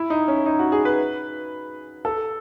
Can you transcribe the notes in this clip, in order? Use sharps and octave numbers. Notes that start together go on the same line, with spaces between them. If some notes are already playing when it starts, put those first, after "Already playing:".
Already playing: E4
D#4
C#4
D#4
F#4
G#4
B4
A4